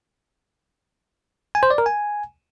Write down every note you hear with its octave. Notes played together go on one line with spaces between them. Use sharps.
G#5
C5
D5
A#4
G#5